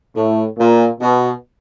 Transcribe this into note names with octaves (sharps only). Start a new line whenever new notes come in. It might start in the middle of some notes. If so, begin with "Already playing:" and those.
A2
A#2
B2